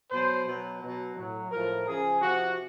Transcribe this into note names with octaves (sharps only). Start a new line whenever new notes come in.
B2 F#3 C5
B2 F#3
B2 F#3
A2 F#3
A2 F3 A#4
C#3 F3 G#4
C3 F3 F#4